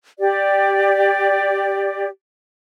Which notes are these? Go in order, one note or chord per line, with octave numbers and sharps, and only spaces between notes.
G4 D5